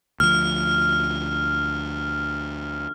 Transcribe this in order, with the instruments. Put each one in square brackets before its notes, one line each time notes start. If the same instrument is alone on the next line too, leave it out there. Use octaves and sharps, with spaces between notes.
[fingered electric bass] D2 F3 [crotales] F6